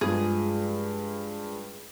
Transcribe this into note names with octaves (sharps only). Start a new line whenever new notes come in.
G2 F3 G#3 G#4